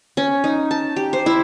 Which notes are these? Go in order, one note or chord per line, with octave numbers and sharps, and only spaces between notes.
C#4
D#4
A5
G4
C5
E4